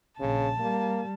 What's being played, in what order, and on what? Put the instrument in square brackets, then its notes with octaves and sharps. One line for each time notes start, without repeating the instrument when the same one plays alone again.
[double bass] A#1 [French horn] C#3 [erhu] A5
[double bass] G3 [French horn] A#3